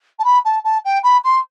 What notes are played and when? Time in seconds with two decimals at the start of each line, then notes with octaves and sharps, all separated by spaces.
0.19 A5
0.24 B5
0.45 A5
0.64 A5
0.84 G5
1.03 B5
1.24 C6